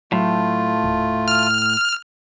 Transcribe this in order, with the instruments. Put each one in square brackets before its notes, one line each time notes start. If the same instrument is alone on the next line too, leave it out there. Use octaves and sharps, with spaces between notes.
[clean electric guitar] A2 [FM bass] F#3 [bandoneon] A3 F4
[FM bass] D#1
[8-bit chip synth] F6